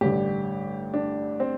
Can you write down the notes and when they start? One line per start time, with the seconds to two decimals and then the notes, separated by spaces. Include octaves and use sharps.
0.01 A1 G2 D3 G4
0.94 D4
1.40 C4